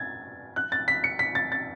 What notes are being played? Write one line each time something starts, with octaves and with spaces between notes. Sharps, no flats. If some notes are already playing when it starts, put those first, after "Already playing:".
Already playing: G#6 A6
F#6
A6
B6
C#7
B6
A6
A6